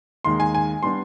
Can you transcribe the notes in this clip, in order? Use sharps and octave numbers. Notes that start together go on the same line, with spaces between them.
D#2 D#3 G#3 C6
G#5
G#5
G3 B3 D4 C6